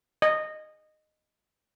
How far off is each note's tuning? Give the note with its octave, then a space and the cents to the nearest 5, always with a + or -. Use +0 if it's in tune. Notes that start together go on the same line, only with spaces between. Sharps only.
D#5 -15